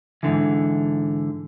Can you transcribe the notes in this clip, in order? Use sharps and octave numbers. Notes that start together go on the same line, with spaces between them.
G#2 B2 D3 E3